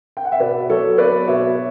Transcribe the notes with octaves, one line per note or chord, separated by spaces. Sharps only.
G5
F#5
E5
B2 B4 D5
F#3 A4 C#5
B3 B4 D5
B2 C#5 E5